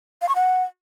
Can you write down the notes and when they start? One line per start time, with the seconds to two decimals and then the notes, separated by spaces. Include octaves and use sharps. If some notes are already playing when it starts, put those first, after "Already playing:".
0.22 F5
0.29 C#6
0.35 F#5